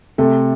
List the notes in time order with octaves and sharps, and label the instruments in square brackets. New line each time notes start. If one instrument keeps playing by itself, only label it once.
[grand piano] C3 [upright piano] A3 A4